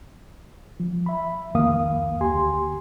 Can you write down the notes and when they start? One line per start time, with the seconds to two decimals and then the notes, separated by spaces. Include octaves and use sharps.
0.80 F3
1.06 E5 B5
1.54 C2 F2 D#3 A#3 F5 D#6
2.20 D2 G4 G#5 C6